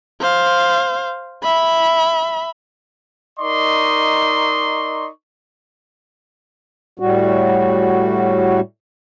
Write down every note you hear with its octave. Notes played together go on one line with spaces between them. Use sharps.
C5 F5
E5 B5
D#4 A#4 D5 D#5 C6 C#6
A2 G3 F#4